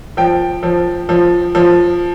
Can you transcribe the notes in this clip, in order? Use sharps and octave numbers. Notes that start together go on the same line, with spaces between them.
F3 G5
F3
F3
F3